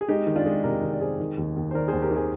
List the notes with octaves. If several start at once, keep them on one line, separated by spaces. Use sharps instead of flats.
G#4
G#3 D#4 G4
D#3
D4 F4
G#3
C3 G4 A#4
D#3
D5
G#3 G#4 C5
D#3
D#2
D#2
C5
D#3 A#4 D5
D#2 G#4 C5
G4 A#4
D#3
G#4 C5